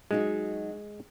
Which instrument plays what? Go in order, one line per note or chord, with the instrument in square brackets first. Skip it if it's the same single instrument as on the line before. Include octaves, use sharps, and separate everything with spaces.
[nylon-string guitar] F#3 D#4 F#4 [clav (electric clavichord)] G#3